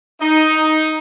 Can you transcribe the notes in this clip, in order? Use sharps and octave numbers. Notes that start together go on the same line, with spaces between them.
D#4